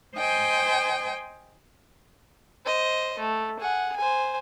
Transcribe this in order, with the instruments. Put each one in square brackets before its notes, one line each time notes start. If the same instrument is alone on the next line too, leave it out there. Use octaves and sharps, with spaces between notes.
[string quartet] C5 D#5 G5 G#5
[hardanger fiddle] C5 D#5
A3
G#4 F#5
C5 G#5